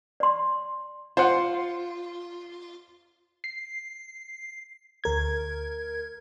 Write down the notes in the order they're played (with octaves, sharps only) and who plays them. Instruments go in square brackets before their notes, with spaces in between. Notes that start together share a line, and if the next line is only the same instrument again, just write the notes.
[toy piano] D5 C6
[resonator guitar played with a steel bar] F4 [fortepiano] C5 F#5
[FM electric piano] C7
D2 A#4 G#6